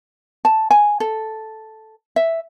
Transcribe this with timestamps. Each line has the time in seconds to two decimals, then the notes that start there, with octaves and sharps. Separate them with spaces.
0.45 A5
0.71 G#5
1.00 A4
2.16 E5